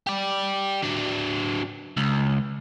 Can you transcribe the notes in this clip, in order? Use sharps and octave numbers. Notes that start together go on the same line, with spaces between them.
G4 D5
F#3 D4
C#2